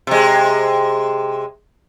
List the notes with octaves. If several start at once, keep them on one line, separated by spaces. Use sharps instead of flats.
C3 G#3